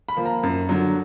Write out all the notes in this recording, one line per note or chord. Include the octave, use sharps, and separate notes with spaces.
B5
F3 A#3
A#5
F#2
D3 F#3